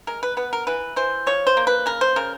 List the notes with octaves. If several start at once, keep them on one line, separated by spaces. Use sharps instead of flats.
G#3 A#4
B4
B3 B4
A#4
E3 B4
E3 C5
F3 C#5
C5
A#3
B4
C#3 A#4
C5
C#3 A#4